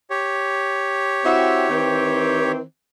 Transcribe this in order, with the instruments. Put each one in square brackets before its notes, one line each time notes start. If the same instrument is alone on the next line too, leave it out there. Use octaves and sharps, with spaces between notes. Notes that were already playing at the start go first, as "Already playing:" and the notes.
[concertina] G4 C#5
[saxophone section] C4 E4 F#4
D#3 E3 C4